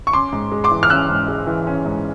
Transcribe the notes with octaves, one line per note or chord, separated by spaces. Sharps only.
C#6
C#4 C6 D6
G#2
G#3
C6 D6
E3
F6
C#4 E6 F#6
G#2
G#3
E3
C#4
G#2